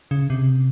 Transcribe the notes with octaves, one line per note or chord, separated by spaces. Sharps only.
C#3
C3